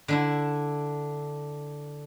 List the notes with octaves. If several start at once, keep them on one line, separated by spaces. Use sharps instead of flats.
D3 D4 E4